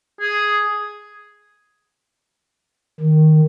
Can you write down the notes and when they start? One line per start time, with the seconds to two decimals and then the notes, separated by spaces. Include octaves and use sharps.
0.20 G#4
3.01 D#3